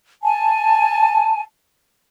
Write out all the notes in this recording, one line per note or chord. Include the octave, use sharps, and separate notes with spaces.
G#5 A5